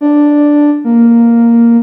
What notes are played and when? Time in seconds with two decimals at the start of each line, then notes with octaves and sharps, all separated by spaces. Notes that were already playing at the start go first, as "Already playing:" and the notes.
0.01 D4
0.84 A#3